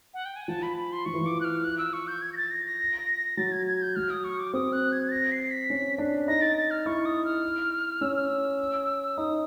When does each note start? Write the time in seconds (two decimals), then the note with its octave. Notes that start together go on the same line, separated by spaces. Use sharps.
0.14 F#5
0.25 G5
0.36 G#5
0.48 F3 A5
0.63 B5
0.77 B5
0.92 C6
1.06 F3 C#6
1.14 E3
1.21 F3 D6
1.41 F#6
1.45 F6
1.64 F#6
1.78 E6
1.93 C#6
2.07 G6
2.22 G#6
2.33 A#6
2.37 A6
2.51 A#6
2.65 A#6
3.37 F#3 A6
3.52 G#6
3.67 G#6
3.82 G6
3.96 F#3 F6
4.10 D#6
4.24 C#6
4.39 D6
4.54 C4 D#6
4.73 F#6
4.92 G#6
5.08 A6
5.11 A#6
5.32 C7
5.51 B6
5.70 C#4
5.98 D4
6.28 D#4 A#6
6.42 A6
6.57 A6
6.71 F6
6.86 E4 C#6
7.06 D#6
7.25 F6
8.01 C#4 E6
8.15 F6
8.28 E6
9.17 D#4 D#6